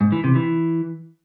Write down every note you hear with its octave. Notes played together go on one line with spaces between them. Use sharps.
G#2
E3
C3
E3